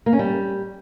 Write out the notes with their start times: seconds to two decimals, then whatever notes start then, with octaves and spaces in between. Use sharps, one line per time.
0.06 A#3
0.13 C#4
0.19 G3